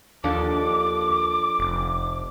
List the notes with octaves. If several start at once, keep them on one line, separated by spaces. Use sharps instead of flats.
D#2 F3 D4 A4 D6
F1